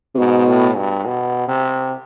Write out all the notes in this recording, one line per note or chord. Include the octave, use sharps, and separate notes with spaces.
C3
G#2 B2
A2
G2
B2
C3